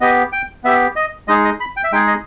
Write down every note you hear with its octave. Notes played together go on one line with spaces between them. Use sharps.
B3 G4 D#5
G5
B3 G4 E5
D#5
G#3 D#4 G#4 D#5
D#5
B5
G5
E5
G#3 D#4 G#4 G5
D#5